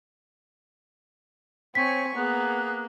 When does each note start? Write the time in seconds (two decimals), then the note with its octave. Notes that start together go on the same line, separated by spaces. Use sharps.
1.75 C4 C#5 G#5 C#6 B6
2.15 A#3 B3 G#4 A#5 F#6